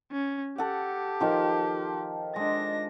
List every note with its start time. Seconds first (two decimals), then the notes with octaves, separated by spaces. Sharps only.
0.12 C#4
0.58 G4 A4 F#5
1.20 D#3 F3
2.36 G#3 D4 A#6